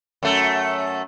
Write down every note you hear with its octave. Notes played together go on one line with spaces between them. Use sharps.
F#2 A3